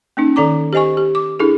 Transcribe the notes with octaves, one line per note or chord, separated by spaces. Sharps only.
A#3 C#4 D#4
D#3 A4 D5 A#5 D6
G4 C5 D#5 G#5 C#6
G4
D6
D4 E4 G#4 A4